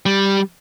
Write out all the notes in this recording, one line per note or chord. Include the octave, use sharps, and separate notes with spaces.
G3